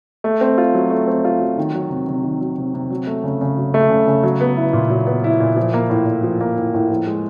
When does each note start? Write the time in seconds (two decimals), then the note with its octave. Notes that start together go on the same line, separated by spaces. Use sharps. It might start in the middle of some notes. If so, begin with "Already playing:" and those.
0.24 A3
0.41 C4
0.58 F4
0.74 F#3
0.90 A3
1.07 C4
1.25 F4
1.40 F#3
1.58 D#3
1.74 F#3
1.90 C3
2.08 C3
2.24 D#3
2.41 F#3
2.58 C3
2.74 C3
2.90 F#3
3.07 A3
3.24 C#3
3.41 C#3
3.57 F#3
3.74 A3
3.90 C#3
4.07 C#3
4.23 F#3
4.41 B3
4.56 E4
4.73 A#2
4.90 F#3
5.07 B3
5.24 E4
5.40 A#2
5.56 F3
5.74 A#3
5.90 A2
6.06 A2
6.23 F3
6.41 A#3
6.57 A2
6.74 A2
6.90 F3
7.07 G#3